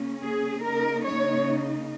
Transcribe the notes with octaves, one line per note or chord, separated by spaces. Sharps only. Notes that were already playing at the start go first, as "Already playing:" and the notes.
Already playing: C#3 A#3 C#4
G#4
C#3 A#3 D#4 A#4
C#5